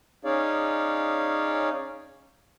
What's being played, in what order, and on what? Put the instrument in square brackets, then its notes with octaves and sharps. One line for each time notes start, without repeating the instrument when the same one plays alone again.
[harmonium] C#4 D#4 G#4 C#5 D5 F5